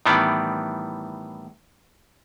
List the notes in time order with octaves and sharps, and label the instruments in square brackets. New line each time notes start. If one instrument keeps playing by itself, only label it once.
[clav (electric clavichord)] A2 D#3 E3 G3 B3